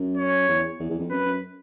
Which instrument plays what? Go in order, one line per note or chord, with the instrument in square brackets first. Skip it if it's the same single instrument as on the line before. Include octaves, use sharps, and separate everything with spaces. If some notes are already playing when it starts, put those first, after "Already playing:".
Already playing: [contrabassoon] F#2
[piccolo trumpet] C#5
[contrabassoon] E2
E2
E2
F2
[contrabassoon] F#2 [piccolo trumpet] B4
[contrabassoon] F#2